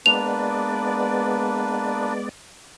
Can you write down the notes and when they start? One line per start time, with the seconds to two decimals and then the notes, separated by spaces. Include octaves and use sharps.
0.06 G#3 A#3 B3 D4 B4 D5 F7